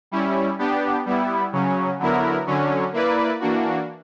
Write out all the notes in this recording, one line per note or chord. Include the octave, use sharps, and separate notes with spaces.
G3 C#4 E4
B3 D4 G4
G3 B3 E4
C#3 F#3 C#4
D3 F#3 B3 E4 A#4
D3 F#3 C#4
A#3 E4 B4 D5
E3 A#3 D4 F#4